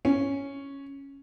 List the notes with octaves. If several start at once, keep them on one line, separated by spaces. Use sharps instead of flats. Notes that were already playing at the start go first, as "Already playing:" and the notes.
C#4